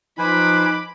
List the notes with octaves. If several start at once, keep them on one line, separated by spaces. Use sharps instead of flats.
F3 D#4 B4 C5 G#5 B5 D6